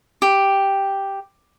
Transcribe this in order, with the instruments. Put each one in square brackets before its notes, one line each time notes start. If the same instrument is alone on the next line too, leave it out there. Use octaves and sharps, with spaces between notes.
[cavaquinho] G4